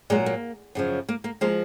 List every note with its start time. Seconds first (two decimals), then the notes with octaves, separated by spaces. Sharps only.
0.10 A#2 F#3 G#3
0.26 A#3
0.75 F#2 C#3 F3
1.09 A#3
1.24 A#3
1.41 F3 G#3 A#3